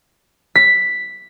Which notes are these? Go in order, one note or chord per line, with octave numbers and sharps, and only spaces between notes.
B6